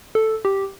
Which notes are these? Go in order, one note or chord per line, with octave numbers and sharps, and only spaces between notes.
A4
G4